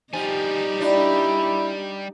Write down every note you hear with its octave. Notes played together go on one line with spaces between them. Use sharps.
F3 G3 D#4 G4 G#5
D4 E4